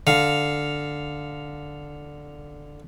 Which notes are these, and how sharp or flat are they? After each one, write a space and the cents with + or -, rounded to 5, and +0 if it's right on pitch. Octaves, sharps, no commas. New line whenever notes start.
D3 +0 F5 +0